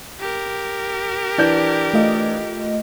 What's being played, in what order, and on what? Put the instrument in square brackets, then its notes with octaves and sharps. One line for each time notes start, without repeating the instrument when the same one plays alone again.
[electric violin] G4 A#4
[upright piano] E3 D4 G6
[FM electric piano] A3 F4 D#5